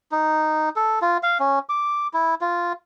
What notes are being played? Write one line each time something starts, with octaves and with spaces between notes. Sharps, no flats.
D#4
A4
F4
F5
C#4
D6
E4
F4